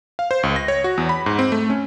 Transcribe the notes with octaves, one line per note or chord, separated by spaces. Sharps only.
F5
C5
C#2
A#6
C#5
F#4
E2
B5
G#2
C4
A3
C#4